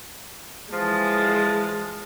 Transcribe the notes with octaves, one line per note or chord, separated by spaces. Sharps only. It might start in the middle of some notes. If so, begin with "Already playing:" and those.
E3 F3 G#3 A5